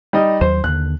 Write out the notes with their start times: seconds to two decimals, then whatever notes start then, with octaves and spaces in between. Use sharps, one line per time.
0.13 G3 D#4 D#5
0.41 D#2 F#3 C5
0.64 D#2 D3 F#6